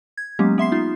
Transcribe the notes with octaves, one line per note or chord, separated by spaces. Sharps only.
G#6
F#3 G#3 A#3 B3 C#4 G4
B3 E5 C6 C7
D#4 F4